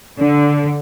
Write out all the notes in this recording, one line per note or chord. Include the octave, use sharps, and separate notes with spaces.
D3